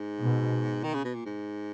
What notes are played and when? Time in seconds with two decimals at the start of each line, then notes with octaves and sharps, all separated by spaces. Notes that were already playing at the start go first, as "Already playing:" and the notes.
Already playing: G#2
0.21 B2
0.84 D#3
0.94 C#3
1.04 B2
1.14 A#2
1.25 G#2